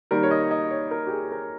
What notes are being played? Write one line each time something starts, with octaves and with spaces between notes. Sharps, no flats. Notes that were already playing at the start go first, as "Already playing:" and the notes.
D#3 G3 A#3 A#4
C#5
D#5
D#5
C#5
A#4
G4
G#4
A#4